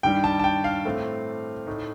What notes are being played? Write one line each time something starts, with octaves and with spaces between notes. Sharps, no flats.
G2 D#3 G3 G5
A5
A5
G5
F5
A2 A3 C4
A2 A3 D#4